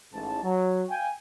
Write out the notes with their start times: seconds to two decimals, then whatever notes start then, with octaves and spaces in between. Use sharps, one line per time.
0.13 A1 G#2 A5
0.43 F#3
0.90 F5 G5 G#5